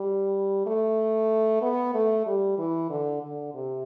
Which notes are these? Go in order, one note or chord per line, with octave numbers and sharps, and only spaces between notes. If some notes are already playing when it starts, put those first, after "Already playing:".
Already playing: G3
A3
B3
A3
G3
E3
D3
D3
C3